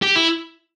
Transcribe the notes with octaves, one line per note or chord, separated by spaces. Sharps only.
G4
E4